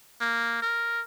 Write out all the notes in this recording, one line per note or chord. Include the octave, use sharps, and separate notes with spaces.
A#3
A#4